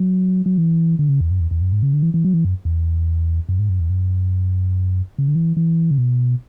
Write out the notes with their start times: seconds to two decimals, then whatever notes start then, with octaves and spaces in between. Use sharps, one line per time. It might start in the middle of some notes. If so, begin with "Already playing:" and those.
Already playing: F#3
0.46 F#3
0.58 E3
0.99 D3
1.09 C#3
1.20 E2
1.31 F#2
1.40 E2
1.51 E2
1.61 F#2
1.72 G#2
1.82 C#3
1.93 D3
2.03 E3
2.14 E3
2.24 F#3
2.34 E3
2.45 F#2
2.65 E2
3.49 F#2
3.59 G#2
3.69 F#2
3.80 E2
3.90 F#2
5.18 C#3
5.28 D3
5.35 E3
5.57 E3
5.91 C#3
5.98 B2